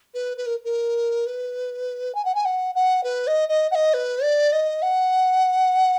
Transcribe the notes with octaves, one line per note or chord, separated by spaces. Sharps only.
B4
B4
A#4
A#4
B4
G#5
F#5
G#5
F#5
F#5
B4
D#5
D#5
F#5
D#5
B4
D5
D#5
F#5